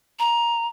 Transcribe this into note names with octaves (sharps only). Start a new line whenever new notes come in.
A#5